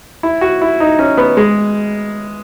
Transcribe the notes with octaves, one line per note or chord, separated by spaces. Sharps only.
E4
F#4
E4
D#4
C#4
B3
G#3